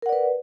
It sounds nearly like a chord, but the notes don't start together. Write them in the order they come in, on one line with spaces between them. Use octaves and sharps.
A#4 F#5 D5 B4